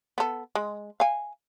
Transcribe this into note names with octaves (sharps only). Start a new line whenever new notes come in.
B3 A4
G#3
F5 G#5